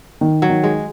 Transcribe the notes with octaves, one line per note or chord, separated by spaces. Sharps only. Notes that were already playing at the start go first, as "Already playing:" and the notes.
D#3
F#3
D#3
G#3